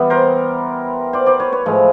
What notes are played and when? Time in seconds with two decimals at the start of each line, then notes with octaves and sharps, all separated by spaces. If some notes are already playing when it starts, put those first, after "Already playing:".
Already playing: E3 G3 B3
0.10 A#4 C5
1.13 C5 D5
1.26 C5 D5
1.40 B4 C#5
1.52 B4 C#5
1.66 A2 F3 G#3